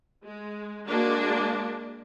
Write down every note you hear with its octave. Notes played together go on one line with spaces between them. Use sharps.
G#3
G#3 A#3 D4 F#4